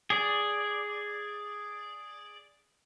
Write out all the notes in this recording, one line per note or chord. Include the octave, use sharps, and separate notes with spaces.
G#4 D5